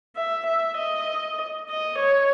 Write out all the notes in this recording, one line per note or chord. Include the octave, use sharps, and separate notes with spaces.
E5
E5
D#5
D#5
C#5